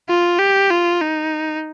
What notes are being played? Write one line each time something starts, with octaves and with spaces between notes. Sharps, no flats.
F4
G4
F4
D#4